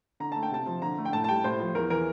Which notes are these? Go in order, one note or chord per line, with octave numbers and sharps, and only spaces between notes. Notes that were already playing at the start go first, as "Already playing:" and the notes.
D3 A#5
A3 A5
G5
C3 A5
F3
D3 A#5
A3
G5
A2 A5
A5
G3 G5
A2 C5
F3
E2 A#4
E3 A#4